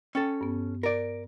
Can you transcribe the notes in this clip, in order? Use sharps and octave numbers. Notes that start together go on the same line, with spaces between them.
C#4 A4 G5 A6
G2 B3
A#4 D5